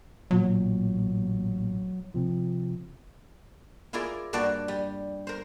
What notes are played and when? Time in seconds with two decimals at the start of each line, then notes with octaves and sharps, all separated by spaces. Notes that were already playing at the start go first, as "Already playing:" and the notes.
0.31 A1 A#2 F#3
2.14 C3 F3
3.93 E4 F4 G#4 A#4 D5
4.33 G2 A#3 D4 F#4 D5
4.68 G3
5.27 A#4 C5